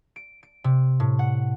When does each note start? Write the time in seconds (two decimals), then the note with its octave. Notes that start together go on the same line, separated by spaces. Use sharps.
0.16 D7
0.43 D7
0.64 C3
1.00 A2
1.19 F#5